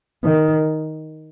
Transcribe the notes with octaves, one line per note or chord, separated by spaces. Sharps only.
D#3